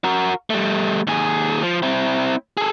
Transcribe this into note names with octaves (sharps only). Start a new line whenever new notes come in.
F#4 A#4
G3 A3
D#2 G#4
F3
C4 E4
G#4 A4